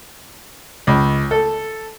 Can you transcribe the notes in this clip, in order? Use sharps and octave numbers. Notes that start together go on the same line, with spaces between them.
C#2
A4